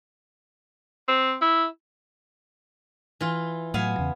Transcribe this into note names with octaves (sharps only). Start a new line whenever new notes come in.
C4
E4
E3 F4
A2 F#3 B3 F5 G#5
E2 C#3